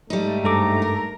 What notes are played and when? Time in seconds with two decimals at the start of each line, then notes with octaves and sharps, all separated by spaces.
0.10 G#2 G3 A3 D#4
0.44 G2 A4 A#5 D6
0.82 A#4